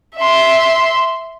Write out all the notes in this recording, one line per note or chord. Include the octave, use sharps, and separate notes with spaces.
E5 C6